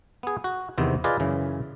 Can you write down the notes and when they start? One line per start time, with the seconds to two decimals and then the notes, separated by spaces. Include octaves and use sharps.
0.23 B3 G#4
0.44 F#4
0.78 E2 C3 D#3 B3 C4
1.04 F4 G#4 B4 D5 D#5
1.20 F#2 C#3 E3